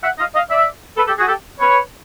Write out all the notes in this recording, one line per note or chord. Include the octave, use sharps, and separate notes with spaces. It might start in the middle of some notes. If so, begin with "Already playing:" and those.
E5 F#5
D#5 F5
D#5 F5
D5 E5
A4 B4
G4 A4
F#4 G#4
G4 A4
B4 C#5